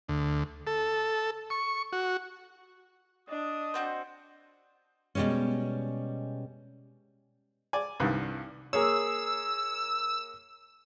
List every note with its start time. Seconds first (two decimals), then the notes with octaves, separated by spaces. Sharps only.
0.09 D2
0.67 A4
1.50 C#6
1.93 F#4
3.29 D4 D#5 D#6
3.74 C4 F#4 C5
5.15 B2 E3 G3 G#3 C#4
7.73 D5 G#5
8.00 C2 G2 D#3
8.73 A#3 G#4 C#5 E6